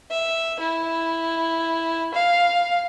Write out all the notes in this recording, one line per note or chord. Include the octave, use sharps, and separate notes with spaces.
E5
E4
F5